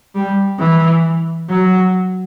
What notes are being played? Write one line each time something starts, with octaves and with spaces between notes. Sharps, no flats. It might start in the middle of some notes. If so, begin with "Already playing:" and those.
G3
E3
F#3